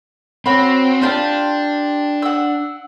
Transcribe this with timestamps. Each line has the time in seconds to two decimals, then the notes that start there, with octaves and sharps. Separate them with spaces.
0.46 C4 F#4 C#5 B5
1.02 D4 F4 G4 A5
2.22 F#5 E6